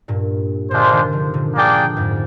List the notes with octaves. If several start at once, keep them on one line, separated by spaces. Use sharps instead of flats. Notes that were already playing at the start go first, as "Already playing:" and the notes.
G2 A#2
A#2 D3 G#3 D4 F4 C5
C3 D#3
D3 F3
A#2 D3
A#3 D4 G#4 D5 G5
F2 G#2